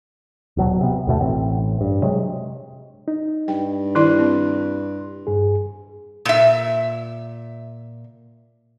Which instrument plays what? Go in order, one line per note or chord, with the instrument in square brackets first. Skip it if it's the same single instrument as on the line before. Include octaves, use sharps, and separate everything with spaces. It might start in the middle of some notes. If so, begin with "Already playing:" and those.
[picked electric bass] D#1 B2 F#3
C3 B3
D#2 B2 A3
A1 C4
G2
C3 F#3 G#3
[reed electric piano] D#4
[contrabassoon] G2 [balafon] G5
[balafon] D#3 E4 D5 [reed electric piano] C6 F#6
[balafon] C4
[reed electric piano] G2 G#4
[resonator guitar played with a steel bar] A#2 E5